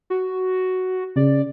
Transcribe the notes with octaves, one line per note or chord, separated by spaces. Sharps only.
F#4
C#3 D5